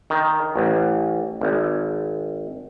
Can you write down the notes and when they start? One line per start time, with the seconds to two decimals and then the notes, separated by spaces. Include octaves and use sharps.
0.10 D#3
0.56 A1
1.41 G#1